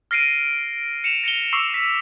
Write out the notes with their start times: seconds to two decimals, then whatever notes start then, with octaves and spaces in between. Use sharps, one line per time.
0.11 F6 A#6 C7 D7 D#7
1.04 C#7 E7 F7
1.24 A#6 C#7 F7 G7
1.53 C#6 D6 E6 C7
1.74 B6